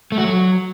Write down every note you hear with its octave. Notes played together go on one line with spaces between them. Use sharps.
A3
F#4
F#3